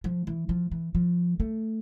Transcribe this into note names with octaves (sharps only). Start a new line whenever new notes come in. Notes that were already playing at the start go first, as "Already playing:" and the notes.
F3
E3
F3
E3
F3
A3